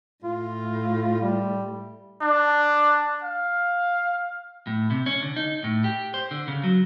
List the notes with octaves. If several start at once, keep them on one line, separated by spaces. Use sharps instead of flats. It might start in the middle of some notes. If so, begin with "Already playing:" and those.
A2 F4
G3
D4
F5
A2
C3
C#4
D3
D#4
A2
G4
C5
D3
C#3
F#3